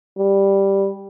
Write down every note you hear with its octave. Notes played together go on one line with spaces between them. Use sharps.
G3